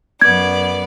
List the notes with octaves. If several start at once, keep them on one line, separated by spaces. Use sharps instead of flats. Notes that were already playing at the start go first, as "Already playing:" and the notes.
F#2 B3 D5 G#6